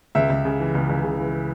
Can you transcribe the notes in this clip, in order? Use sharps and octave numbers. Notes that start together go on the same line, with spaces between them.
C#2 E5
C#2
C#3
E3
C#2
C#2
C#3
E3